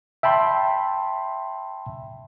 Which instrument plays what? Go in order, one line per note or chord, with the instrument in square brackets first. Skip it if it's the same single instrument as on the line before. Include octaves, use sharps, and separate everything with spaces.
[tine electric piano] E5 G5 A5 B5 C6